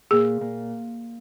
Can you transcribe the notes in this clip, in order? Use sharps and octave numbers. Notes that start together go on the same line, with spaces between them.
A#2 G#4
A#2